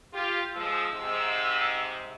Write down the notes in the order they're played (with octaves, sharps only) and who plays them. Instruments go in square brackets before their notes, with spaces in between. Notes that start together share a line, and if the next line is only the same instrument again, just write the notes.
[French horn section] F4 G4
[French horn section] F3 G#3 [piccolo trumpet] E6
[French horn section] G#2 C3